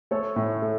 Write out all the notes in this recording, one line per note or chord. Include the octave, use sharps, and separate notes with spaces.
A3 A4 C#5
A2
A3